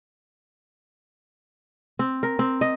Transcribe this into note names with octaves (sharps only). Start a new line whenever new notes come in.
C4
A#4
C4
D#5